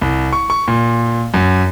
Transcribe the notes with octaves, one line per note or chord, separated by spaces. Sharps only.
C2
C#6
C#6
A#2
F#2